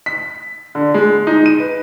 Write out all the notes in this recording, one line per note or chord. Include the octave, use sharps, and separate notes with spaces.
B6
D3
G#3
D#4
D#7
B4